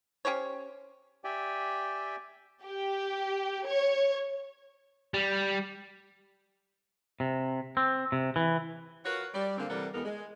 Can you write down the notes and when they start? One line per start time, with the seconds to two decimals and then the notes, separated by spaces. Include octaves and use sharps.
0.25 C#4 G4 C5 C#5
1.24 G4 D5 E5 G5 G#5
2.63 G4
3.66 C#5
5.14 G3
7.20 C3
7.77 C4
8.12 C3
8.36 E3
9.04 F4 F#4 A#4 B4 C#5 F#5
9.33 G3 D5
9.57 D3 G#3 A#3 C4
9.69 C3 E3 G3 A4 A#4 F#5
9.94 E2 G3 G#3 B3 A4 A#4
10.05 G#3